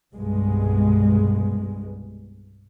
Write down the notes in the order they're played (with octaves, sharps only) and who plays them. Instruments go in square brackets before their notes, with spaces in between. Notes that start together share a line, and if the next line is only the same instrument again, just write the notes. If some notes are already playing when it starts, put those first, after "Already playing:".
[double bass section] C2 G2 B2 G#3